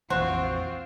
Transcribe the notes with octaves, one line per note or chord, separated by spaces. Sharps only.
A#1 F2 E3 C4 F4 F#4 C5